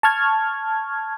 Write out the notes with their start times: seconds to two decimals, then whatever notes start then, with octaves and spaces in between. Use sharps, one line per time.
0.03 A5 C#6 F6 G#6